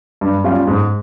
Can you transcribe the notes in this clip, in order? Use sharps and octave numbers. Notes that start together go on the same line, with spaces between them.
G2
G3 C#4 F4
G#2